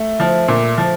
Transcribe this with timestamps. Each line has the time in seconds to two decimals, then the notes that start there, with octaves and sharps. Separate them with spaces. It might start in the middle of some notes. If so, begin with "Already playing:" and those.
Already playing: A3
0.20 F3
0.48 A#2
0.78 F3